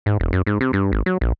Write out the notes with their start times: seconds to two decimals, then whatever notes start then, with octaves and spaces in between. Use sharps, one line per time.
0.06 G#2
0.20 E1
0.33 F#2
0.47 G#2
0.61 C3
0.73 G2
0.92 G#1
1.06 F#3
1.21 A#1